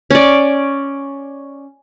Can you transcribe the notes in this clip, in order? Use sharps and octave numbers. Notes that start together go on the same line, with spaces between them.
C#4 D5